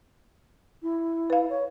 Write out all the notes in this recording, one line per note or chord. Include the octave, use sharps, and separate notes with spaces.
E4
B4 F5
C#5